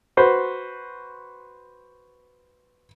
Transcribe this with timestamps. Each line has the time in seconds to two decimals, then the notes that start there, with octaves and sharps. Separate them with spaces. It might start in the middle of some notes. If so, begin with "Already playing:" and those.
0.17 F#4 B4 C5